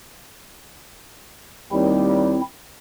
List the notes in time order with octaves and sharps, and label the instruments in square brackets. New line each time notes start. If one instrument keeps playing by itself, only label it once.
[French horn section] D#2 G3 [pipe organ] C4 E4